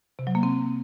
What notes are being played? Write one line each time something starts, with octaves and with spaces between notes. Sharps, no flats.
C3
F#3
A#3
C4